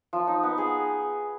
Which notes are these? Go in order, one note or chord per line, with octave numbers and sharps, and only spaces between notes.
F3
D#4
B3
G#4